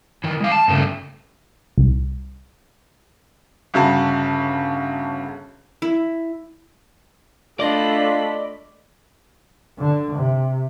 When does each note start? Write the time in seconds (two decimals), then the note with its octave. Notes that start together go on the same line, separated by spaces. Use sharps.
0.24 D#3 E3
0.40 G#3 F5
0.52 A5
0.68 G2 C#3 A3
1.78 C2
3.74 G1 C#3 F#4 A5
5.82 E4
7.60 A3 D4 F4 D5 D#5 B5
9.79 D3
10.16 C3